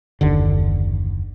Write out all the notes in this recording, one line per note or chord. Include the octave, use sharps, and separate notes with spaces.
F#1 D#2 D3